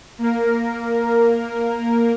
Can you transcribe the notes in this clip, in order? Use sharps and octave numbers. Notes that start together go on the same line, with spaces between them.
A#3 A#4